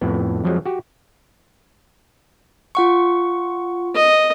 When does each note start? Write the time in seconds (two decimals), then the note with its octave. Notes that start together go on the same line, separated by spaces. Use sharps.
0.01 F2 A2 B3
0.44 F2 F3 F#3 G#3
0.66 F#4 G4
2.75 F4 F#5 C#6
3.95 D#5